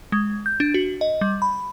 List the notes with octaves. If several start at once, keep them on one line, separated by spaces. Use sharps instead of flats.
G#3
G6
D4
F#4
D#5
G3
B5